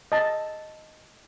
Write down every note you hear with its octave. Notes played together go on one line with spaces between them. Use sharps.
D#5 A5